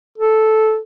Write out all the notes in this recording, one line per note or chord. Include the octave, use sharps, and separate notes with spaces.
A4